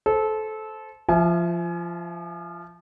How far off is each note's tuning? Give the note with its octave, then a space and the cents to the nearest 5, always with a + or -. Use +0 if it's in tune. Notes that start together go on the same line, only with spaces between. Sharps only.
A4 -20 C5 +0
F3 -15 E5 +0 G#5 +30